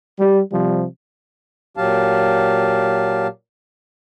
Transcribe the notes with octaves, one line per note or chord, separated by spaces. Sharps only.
G3
C3 F3 G3
A#2 F#3 G4 F5 A5